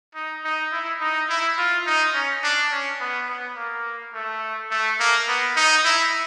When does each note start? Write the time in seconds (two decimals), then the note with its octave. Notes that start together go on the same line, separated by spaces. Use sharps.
0.15 D#4
0.44 D#4
0.72 E4
1.01 D#4
1.29 E4
1.58 F4
1.86 D#4
2.15 C#4
2.43 D4
2.71 C#4
3.00 B3
3.29 B3
3.56 A#3
4.14 A3
4.71 A3
4.99 A#3
5.27 B3
5.56 D#4
5.84 E4